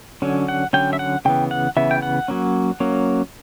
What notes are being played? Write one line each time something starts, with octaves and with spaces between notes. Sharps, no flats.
D3 F#3 C#4
F#5
D3 F#3 C#4 G5
E5
F#5
C#3 E3 B3 G5
F#5
C#3 E3 B3 E5
G5
F#5
F#3 A#3 C#4
F#3 A#3 C#4